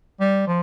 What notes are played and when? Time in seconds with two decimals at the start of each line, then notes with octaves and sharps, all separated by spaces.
0.20 G3
0.47 F3